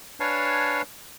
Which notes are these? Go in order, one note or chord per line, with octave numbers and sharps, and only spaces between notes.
D4 B4 C#5 F5 G#5 A5